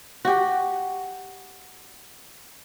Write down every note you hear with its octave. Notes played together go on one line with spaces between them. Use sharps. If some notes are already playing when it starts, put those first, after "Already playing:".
F#4 G4